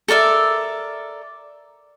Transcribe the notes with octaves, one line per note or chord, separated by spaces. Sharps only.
A4 A#4 D5 E5